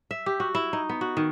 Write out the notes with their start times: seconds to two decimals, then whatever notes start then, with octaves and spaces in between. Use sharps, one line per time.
0.11 E5
0.26 G4
0.40 F#4
0.55 E4
0.73 D#4
0.89 B3
1.01 F#4
1.17 D#3